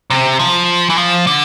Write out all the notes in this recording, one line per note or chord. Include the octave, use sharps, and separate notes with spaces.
C3
F3
E3
F3
D3